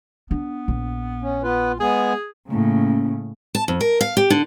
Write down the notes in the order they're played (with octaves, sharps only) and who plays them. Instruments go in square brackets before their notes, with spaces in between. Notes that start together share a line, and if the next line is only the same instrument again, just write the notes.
[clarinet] B3 [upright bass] D4
[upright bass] A#1
[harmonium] C#4
[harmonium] B3 B4 [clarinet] F4
[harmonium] G#3 B3 G#5 [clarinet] G#4
[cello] A2 C#3 [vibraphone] A3 A#3 C#4
[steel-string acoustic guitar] A5
F2
A#4
F5
G4
D3